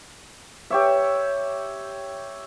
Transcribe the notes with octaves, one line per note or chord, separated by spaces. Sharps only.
G4 C#5 E5